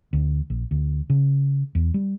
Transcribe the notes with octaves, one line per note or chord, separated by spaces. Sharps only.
D2
A#1
D2
C#3
E2
G3